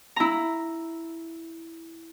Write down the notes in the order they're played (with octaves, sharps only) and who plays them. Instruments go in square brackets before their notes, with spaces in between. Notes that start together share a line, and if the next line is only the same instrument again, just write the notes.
[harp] E4 A#5